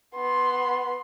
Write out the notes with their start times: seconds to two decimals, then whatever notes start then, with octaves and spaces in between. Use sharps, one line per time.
0.15 B3 C6